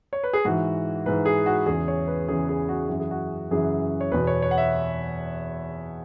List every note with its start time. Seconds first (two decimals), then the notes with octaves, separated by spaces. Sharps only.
0.13 C#5
0.24 B4
0.33 G#4
0.45 G#2 E3 F#4
1.06 G#2 E3 B4
1.25 G#4
1.46 F#4
1.66 E2 C#3 E3 G#4
1.88 C#5
2.08 B4
2.28 E2 C#3 E3 G#4
2.49 G#4
2.69 F#4
2.89 F#2 C#3 E3 F#4
3.00 G#4
3.11 F#4
3.51 F#2 C#3 E3 G#4
4.01 C#5
4.12 E2 B2 B4
4.27 C#5
4.42 C#5
4.51 F#5
4.58 E5